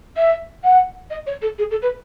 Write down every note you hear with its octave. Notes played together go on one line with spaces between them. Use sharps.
E5
F#5
D#5
C#5
A4
G#4
A4
B4